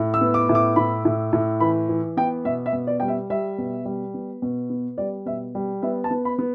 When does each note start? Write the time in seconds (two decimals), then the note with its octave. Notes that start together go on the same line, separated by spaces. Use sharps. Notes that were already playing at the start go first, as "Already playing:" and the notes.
Already playing: A2
0.14 E6
0.21 B3
0.34 D6
0.49 A2
0.55 D6
0.76 A2 B5
1.05 A2
1.33 A2
1.60 E3 B5
1.89 E3
2.17 B3 G5
2.45 B2 E5
2.66 E5
2.73 B2
2.87 D5
3.00 G3 G5
3.08 E5
3.30 G3 E5
3.58 B2
3.85 G3
4.14 B3
4.42 B2
4.70 B3
4.98 G3 D5
5.26 B2 E5
5.55 G3
5.82 B3 E5
6.04 A5
6.11 B3
6.25 B5
6.39 B3